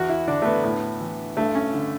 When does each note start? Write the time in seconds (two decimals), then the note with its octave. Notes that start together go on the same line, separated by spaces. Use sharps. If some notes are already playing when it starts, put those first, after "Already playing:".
Already playing: E2 F#4
0.09 E4
0.28 D3 D4
0.42 A3
0.45 B3
0.64 A2
1.01 E3
1.37 G2 A3
1.55 C#4
1.74 D3